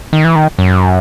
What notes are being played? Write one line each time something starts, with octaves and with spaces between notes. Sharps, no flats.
D#3
E3
D#3
F#2